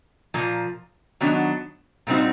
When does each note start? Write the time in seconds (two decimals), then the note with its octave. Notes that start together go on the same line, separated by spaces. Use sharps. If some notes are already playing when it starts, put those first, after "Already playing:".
0.34 A#2 F3 A#3
1.21 D#3 F#3 B3 D4
2.07 A#2 G3 C4 D#4 F#4